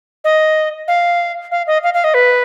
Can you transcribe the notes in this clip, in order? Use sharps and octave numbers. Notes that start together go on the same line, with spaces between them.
D#5
F5
F5
D#5
F5
F5
D#5
B4